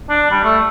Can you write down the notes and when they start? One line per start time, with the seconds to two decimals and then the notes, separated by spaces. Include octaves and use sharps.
0.09 D4
0.31 G3
0.44 A3